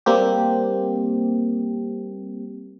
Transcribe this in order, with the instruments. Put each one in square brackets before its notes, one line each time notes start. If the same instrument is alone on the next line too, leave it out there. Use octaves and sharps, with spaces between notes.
[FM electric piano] G3 A#3 C4 G4